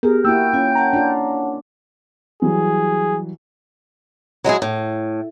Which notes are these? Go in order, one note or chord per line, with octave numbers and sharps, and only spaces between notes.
B3 G4 G#4 A#4
A#3 E4 F#4 G5 E6 G6
C#4 F4 F5
C#5 F#5 A5 A#5
D4 F4
E3 F#3 G3 G#4
F#3 G#3 E4 G#4
A2